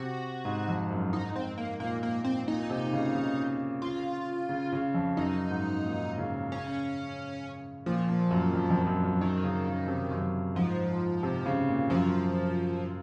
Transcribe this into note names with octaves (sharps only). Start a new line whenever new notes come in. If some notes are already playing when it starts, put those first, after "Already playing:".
Already playing: C3 F#4
G#2
F2
F#2
G#2 D#4
G#2 C4
A#3
A#2 A#3
A#3
C4
A#2 D#4
C3
C#3
C#3
F4
C#3
C#3
F2
F#2 D#4
G#2
A#2
C#3
C#4
A#2 F3
A#2
F#2
F2
F2
F#2
F#2
F#2 D#3
C#3
C#3
C3
F#2
G#2 F3
C3
C#3
A#2
F#2 F3